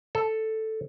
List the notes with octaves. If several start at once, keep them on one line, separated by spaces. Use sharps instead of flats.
A4